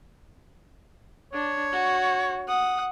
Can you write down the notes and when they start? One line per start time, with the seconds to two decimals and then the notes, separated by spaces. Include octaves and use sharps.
1.33 D4 C#5
1.72 F#4
2.48 F#5 D#6